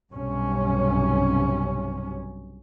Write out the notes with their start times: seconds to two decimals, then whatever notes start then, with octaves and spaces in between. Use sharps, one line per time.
0.13 B1 G2 C3 C#4